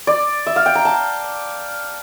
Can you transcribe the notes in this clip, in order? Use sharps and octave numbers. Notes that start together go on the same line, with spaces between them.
D5
E5
F5
G5
A#5
A5